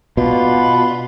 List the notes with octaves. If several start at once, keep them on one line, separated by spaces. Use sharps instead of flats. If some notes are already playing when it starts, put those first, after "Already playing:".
B2 D4 F4 F#5 B5